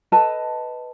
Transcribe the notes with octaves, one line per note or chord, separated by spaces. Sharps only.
A4 B4 D#5 A5